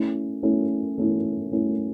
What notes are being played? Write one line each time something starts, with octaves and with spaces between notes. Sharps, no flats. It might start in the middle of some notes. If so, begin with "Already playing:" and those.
Already playing: A3 C#4 E4
A3 C#4 E4
A3 C#4 E4
A3 C#4 E4